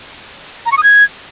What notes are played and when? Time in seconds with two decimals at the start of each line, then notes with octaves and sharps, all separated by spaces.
0.66 A#5
0.72 C#6
0.77 D#6
0.83 G#6